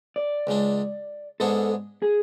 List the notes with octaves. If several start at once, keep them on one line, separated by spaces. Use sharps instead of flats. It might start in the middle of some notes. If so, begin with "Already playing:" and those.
D5
C#2 C#3 G#3 D4
G#2 G#3 B3 D4 G#4 A4
G#4